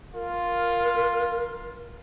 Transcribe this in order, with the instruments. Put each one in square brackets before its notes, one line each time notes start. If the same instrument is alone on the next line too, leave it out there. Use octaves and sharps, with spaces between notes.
[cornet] F4 [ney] A#4